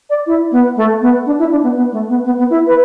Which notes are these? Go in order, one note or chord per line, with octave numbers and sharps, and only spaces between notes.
D5
E4
B3
A3
B3
D4
E4
D4
B3
B3
A3
B3
B3
B3
E4
B4